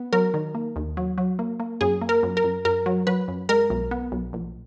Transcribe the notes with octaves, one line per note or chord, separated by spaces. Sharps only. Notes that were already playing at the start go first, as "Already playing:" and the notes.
Already playing: B3
F#3 A#4
D#3
A#3
D#2
F#3
F#3
A#3
A#3
F#2 G#4
A#3
A#4
F#2
A#4
F#2
F#2 A#4
F#3
F#3 B4
F#2
G#3 A#4
B1
B3
B1
A#1